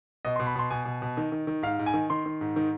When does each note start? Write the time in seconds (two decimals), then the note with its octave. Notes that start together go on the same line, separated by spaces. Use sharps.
0.25 B2 D#5
0.36 C6
0.39 B2
0.47 B5
0.55 B2 C6
0.70 B2 G#5
0.85 B2
1.02 B2
1.17 D#3
1.32 D#3
1.47 D#3
1.63 G#2 F5
1.79 G#2
1.86 G#5
1.94 D#3
2.10 D#3 C6
2.26 D#3
2.41 G#2
2.56 D#3